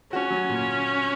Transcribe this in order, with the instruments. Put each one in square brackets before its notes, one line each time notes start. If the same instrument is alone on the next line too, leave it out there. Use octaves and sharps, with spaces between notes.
[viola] C#4 [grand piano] F#4
[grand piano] F#3
A#2